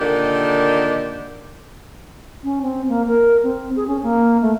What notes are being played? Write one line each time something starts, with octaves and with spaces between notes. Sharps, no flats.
A#2 D3 D#3 D4 G4
C#4
C4
A#3
A#4
C4
G#4
C#4
A#3
A3